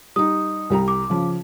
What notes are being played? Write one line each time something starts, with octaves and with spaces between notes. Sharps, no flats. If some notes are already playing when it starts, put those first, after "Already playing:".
G3 D#4 D#6
C2 G3 A#5
D6
C#3 F3